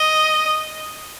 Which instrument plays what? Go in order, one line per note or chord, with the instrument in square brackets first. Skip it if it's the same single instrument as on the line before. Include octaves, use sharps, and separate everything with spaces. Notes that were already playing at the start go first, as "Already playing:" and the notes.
Already playing: [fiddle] D#5